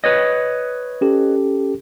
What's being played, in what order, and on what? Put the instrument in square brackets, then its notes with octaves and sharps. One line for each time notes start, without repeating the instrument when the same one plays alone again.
[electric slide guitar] B4 C#5 D#5
[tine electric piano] C#4 G4 A4